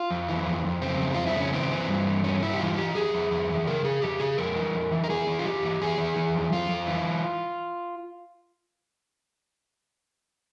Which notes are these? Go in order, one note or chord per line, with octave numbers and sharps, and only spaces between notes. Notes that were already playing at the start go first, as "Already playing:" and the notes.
Already playing: F4
F2
E3
F2
F2
C#3 C4
F2
F2 F4
E4
C#3 C#4
E3 C4
E3
G2
E3
G2 C#4
G2 E4
G4
E3 F4
E3 G4
F2 G#4
F2
F2
E3
C#3 A#4
C#3 G#4
F2 G4
C#3 G#4
F2 A#4
E3
F2
E3
A#4
E3 G#4
E3
F4
F2 G4
E3
E3 G#4
E3
E3
F2
F2 F4
F2
E3